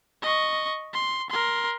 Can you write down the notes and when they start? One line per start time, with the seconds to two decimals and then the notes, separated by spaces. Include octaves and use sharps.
0.22 D#5 C#6
0.93 C6
1.30 A#4 C6